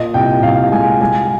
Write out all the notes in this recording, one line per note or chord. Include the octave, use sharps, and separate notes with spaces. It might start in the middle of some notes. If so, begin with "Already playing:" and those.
Already playing: A#2 D#5
C2 G5
C2 F5
G#3 G#5
G#3 G#5